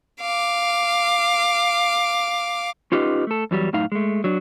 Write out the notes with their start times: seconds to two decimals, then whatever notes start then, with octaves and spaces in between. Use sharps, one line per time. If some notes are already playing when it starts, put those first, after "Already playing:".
0.21 F5 D6
2.92 C#4 D#4 F4 G4 B4 D#5
3.27 A3 A4
3.51 E2 F#3 G3
3.73 F#2 A2 D#4 F5
3.92 G#3 A3
4.24 F#3 D4